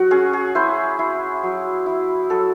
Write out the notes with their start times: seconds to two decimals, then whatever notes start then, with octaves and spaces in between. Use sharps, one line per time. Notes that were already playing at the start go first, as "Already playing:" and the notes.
Already playing: F#3 F#4
0.11 C#4 G#4
0.33 G#4
0.55 E4 C5
0.99 E4
1.43 F#3
1.86 E4
2.30 F#3 A4